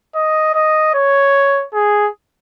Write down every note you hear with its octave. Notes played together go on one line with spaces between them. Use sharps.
D#5
D#5
C#5
G#4